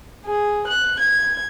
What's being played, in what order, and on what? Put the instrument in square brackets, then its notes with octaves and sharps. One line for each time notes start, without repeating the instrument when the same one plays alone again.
[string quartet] G#4
F#6
G#6